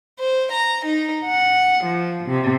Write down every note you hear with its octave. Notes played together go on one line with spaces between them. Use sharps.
C5
A#5
D#4
F#5
F3
C3